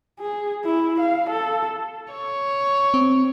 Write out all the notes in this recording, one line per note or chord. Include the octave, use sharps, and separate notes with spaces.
G#4
E4
F5
A4
C#5
C4